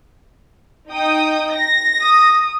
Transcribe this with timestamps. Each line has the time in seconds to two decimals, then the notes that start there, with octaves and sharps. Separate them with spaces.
0.90 D#4 G5 D#6
1.54 A#6
2.02 D#6